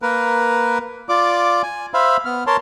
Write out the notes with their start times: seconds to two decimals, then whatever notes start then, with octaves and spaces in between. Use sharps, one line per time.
0.02 A#3 A#4 B4
1.09 F4 D5 D6
1.63 G#5
1.94 C5 E5 F5 B5
2.25 B3 F6
2.47 A#4 C#5 A5 C6